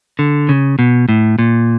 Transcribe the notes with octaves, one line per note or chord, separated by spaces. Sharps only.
D3
C#3
B2
A2
A#2